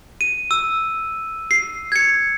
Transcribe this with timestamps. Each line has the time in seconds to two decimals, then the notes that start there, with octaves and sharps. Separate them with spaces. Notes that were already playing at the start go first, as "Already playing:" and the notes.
0.21 D#7
0.51 E6
1.51 C7
1.92 G#6 C#7